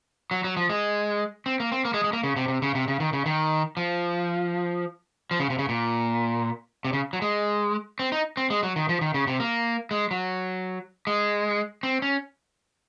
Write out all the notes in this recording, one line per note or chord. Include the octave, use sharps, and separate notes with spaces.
F#3
F#3
F3
G#3
C4
A#3
C4
A#3
G#3
G#3
A#3
C#3
C3
C3
C#3
C3
C#3
D#3
C#3
D#3
F3
F3
C#3
C3
C#3
A#2
C3
C#3
F#3
G#3
C4
D#4
C4
G#3
F#3
D#3
F3
D#3
C#3
C3
A#3
G#3
F#3
G#3
C4
C#4